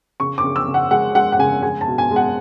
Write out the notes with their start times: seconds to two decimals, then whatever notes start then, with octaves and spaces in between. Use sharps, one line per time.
0.20 C#3 C#6
0.38 D6
0.44 C#3
0.56 E6
0.68 C#3
0.74 F#5
0.91 G#3 F#5
1.15 G#3 F#5
1.32 F#5
1.39 C#3 G#5
1.62 G#3 G#5
1.81 A5
1.87 B2
1.98 G#5
2.11 G#3
2.16 F#5